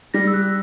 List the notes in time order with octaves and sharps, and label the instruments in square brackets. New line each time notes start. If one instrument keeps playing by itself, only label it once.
[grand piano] G3 [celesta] A#6
[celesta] E6
F#6